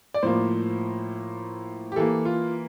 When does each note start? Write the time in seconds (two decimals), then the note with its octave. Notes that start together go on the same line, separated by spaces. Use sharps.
0.14 D5
0.23 A2 F3 A#3 C5
1.92 G4
1.96 E3 A#3 A4
2.25 F4